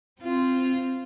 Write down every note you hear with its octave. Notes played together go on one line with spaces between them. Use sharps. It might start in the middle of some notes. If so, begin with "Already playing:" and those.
C4 F4